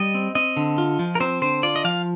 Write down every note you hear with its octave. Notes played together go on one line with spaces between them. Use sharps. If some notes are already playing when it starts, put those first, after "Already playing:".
Already playing: G3 D#5
C4
C4 D#5
D3
F4
F3
A#4
C4 C5
D3 C5
F4 D5
D#5
F3 F5